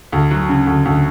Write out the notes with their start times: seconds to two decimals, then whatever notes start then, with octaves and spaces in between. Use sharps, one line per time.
0.12 D2
0.31 F#3
0.49 C#3
0.67 D2
0.85 D2